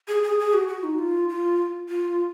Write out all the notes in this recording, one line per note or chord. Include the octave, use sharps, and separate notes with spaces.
G#4
G#4
G#4
F#4
F#4
D#4
F4
F4
F4